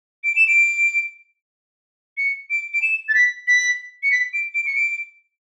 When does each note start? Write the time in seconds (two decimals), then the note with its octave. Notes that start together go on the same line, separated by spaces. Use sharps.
0.24 D7
0.36 E7
0.47 D7
2.18 C#7
2.50 D7
2.74 D7
2.82 E7
3.09 A6
3.15 B6
3.48 B6
4.03 C#7
4.12 B6
4.33 D7
4.54 D7
4.67 C#7
4.76 D7